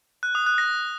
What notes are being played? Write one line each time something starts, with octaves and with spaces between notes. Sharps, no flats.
F#6
D#6
F#6
A#6